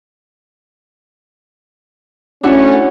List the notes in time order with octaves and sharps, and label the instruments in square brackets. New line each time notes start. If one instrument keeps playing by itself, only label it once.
[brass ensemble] A3 C#4 [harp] D4 E4 F#4